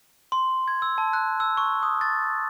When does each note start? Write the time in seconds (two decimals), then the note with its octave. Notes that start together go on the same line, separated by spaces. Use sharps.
0.32 C6
0.68 G#6
0.82 E6
0.98 A5
1.13 F#6
1.40 E6
1.57 C#6
1.83 D#6
2.01 A6